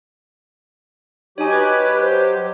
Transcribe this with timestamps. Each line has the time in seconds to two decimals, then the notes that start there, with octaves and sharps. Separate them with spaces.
1.38 F#3 D#4 G4 C#5 G#5
1.51 B4 D#5 D6 G#6
2.02 C5